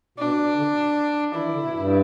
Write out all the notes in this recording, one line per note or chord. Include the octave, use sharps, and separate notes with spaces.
B2 D4
D3
E3 E4
E3
D3
B2
G2